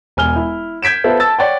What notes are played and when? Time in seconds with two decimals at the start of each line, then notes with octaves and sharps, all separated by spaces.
0.17 E1 G#5 F6 G7
0.36 E4
0.83 G6 G#6 B6 D7 E7
1.04 B3 F4 A4 C5 E5
1.20 A5 E6 A6
1.39 C#5 D5 F#5 G5